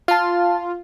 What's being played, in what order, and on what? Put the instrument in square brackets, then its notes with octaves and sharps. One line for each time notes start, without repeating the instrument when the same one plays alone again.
[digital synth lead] F4 [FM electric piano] F5 A5